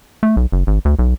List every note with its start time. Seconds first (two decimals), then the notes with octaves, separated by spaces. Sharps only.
0.23 A3
0.37 B1
0.52 F#1
0.67 G#1
0.85 D2
0.99 B1